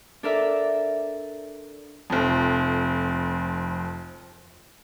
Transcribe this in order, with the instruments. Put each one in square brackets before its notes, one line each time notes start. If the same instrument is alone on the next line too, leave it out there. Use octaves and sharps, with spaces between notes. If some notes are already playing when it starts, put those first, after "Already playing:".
[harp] D4 A4 A#4 D5 E5
[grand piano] F1 F2